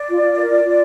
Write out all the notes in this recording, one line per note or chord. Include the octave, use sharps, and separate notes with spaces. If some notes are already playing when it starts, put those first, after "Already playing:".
Already playing: D5
F4
F4
A#4
F4
F4